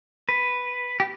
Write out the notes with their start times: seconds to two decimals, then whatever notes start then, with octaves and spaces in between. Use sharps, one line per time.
0.29 B4
1.00 G4